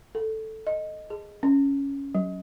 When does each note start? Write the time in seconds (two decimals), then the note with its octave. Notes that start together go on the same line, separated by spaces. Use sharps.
0.15 A4
0.67 D#5
1.10 G#4
1.43 C#4
2.15 F#3